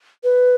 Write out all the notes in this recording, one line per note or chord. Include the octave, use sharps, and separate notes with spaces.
B4